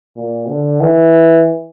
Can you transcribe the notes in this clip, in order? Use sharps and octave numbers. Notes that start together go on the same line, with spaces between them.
A#2
D3
E3